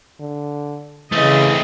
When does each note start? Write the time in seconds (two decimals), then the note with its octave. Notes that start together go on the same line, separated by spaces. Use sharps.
0.20 D3
1.12 C#3 E3 A3 C4 D#5